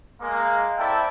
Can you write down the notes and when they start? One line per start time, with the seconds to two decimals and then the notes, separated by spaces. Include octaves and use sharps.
0.21 G#3 A#3
0.78 C4 E4 A4 D5 E5 G5